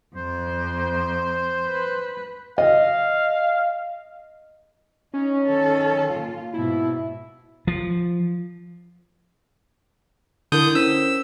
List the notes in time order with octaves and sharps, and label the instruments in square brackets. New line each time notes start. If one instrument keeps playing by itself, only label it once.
[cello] F2 [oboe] C5
[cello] B4
[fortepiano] D#5 [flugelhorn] F5
[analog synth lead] C#4 [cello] D#4
[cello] D#3 A4
A#2 F4
[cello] G#2 B2 [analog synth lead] E4
[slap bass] F3
[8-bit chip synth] D3 D#6 G6 [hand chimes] E4 A#4
[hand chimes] C#4 C5 B6 [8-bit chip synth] E6